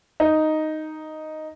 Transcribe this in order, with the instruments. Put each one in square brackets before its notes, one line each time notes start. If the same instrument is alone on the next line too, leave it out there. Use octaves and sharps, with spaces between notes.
[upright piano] D#4